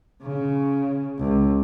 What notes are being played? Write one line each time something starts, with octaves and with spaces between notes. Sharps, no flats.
C#3
C#2